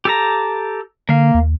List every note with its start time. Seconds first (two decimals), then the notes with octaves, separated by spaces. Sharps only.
0.05 G4 A4 A#5
1.09 D3 A#3 F5
1.34 D#2